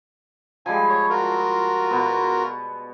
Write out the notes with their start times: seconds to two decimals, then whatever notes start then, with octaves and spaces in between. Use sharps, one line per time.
0.66 F3 G3 G#3 G#5
0.89 C#5
1.10 F4 F#4 A#4
1.91 B2 B3